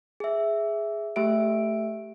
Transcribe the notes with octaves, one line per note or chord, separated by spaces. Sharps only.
G#4 E5
A3 G4 E5 D7